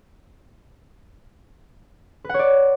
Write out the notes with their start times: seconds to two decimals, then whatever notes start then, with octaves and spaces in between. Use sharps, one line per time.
2.25 B4
2.29 F#5
2.34 C#5
2.39 D5